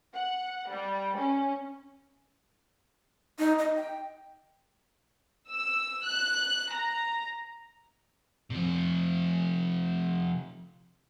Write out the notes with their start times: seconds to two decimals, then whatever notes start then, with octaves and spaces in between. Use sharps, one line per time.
0.14 F#5
0.70 G3
1.17 C#4
3.39 D#4
3.59 D#5
3.76 G5
5.49 E6
6.06 F#6
6.72 A#5
8.50 C3 F3